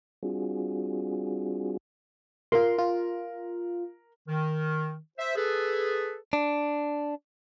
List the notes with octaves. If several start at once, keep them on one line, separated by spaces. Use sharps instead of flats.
G3 C4 D4 F4 F#4 G#4
F4 A#4 C6
F4
D#3
C5 E5
G#4 A4 B4
D4